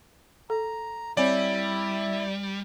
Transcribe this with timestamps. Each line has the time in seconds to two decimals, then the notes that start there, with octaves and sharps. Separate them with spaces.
0.50 A4 A#5
1.17 G3 C4 E4 C#5 D5 E5